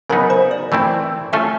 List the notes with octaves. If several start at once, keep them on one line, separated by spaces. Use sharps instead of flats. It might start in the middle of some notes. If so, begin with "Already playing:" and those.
C#3 F#3 B3 D#4 A#4
C5
D5
E3 A3 C4 E4
A3 C#4 F4 A4 E5